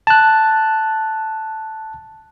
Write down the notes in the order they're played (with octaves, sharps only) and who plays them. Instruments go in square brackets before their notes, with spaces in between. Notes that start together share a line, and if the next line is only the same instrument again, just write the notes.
[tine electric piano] A5 F#6